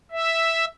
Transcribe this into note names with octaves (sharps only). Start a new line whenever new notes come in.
E5